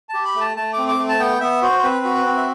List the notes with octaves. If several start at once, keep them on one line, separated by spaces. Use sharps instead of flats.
A5
G4
B5
A3
A5
A3 A5
C4 D6
D6
A3
A5
B3 G5
B3 E5
F#4 C5
C5
C4 B4
F#4
B4
C4
E5